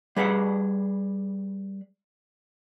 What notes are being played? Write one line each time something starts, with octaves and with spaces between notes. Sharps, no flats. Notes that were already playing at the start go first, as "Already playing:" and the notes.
G3 G#4 B4 D5 E5 F#5